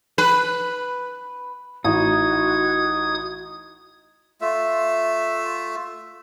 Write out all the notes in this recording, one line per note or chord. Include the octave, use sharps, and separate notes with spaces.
B4
A1 D#4 F#4 D#6 G#6
A3 F4 E5